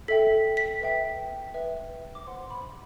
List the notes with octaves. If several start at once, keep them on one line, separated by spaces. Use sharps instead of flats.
A4 E5 G5 B6
B6
B4 E5 G5
B4 E5 G5
D6
C5 F#5 C6
B5